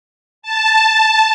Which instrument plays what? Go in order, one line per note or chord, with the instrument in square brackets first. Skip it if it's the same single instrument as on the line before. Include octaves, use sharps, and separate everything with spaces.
[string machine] A5